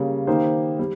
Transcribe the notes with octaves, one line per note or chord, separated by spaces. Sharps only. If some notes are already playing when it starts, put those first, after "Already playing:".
Already playing: C#3 G3 A#3
D#3 A#3 D#4 G4 C5
G3